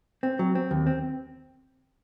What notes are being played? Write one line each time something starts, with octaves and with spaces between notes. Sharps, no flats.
C4
F#3
C4
D#2
C4